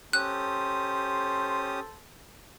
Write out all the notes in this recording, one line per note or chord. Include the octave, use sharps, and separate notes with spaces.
C#4 G4 A4 C5 D#6 F#6